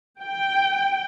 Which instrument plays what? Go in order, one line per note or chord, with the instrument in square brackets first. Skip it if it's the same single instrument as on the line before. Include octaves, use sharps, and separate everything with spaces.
[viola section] G5